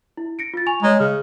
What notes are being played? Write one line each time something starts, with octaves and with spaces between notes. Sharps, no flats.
E4
A#6 C#7 D7
F4 A6
G#5 C#6 F7
G#3 C#5 D#5 A#5
C#3 F6